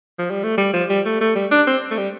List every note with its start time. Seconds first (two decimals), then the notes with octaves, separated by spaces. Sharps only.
0.18 F3
0.31 G3
0.43 A3
0.58 G3
0.74 F3
0.90 G3
1.05 A3
1.21 A3
1.35 G3
1.51 D4
1.67 C4
1.91 A3
1.97 G3